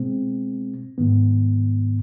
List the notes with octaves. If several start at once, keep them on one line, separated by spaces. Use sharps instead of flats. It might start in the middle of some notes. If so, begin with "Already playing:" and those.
Already playing: B2 G#3 C4
G#2 D#3 B3